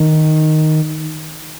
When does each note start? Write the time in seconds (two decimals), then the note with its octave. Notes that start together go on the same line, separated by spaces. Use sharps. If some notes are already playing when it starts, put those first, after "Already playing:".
Already playing: D#3